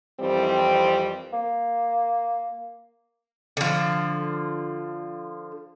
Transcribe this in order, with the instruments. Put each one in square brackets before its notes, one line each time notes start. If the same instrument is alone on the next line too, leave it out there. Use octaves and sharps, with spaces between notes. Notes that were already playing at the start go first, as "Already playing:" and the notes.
[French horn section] F2 D#3 E3 G3 C4
[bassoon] A#3
[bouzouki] D3 F3